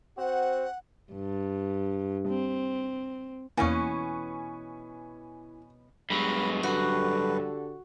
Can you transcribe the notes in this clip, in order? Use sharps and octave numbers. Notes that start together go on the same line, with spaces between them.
C4 F#4 C5 F#5
G2
C4
E2 B2 E3 A#3 B3 C#4 G#5 C#6
G2 F#3 G#3 B3 B5
D3 F#4 G4 A4 B4